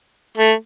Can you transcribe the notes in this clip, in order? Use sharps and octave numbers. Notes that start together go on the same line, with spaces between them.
A3